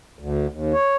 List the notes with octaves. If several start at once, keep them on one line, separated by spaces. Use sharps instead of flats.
D2
D#2
C#5